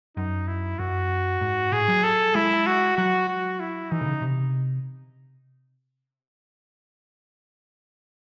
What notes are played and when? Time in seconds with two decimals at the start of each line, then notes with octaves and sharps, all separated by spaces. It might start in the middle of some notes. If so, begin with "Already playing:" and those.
0.17 F#2 D#4
0.47 E4
0.79 F#2 F#4
1.41 G#2
1.72 A2 G#4
1.88 F#3
2.04 A4
2.35 G#3 E4
2.67 F#4
2.97 F#3 F#4
3.28 F#4
3.60 E4
3.92 E3 D#4
4.01 C3
4.06 C#3
4.22 C3